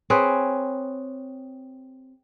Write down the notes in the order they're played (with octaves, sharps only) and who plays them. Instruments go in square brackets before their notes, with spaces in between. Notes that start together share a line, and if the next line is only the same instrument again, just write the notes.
[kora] C4 G#4 B4 C#5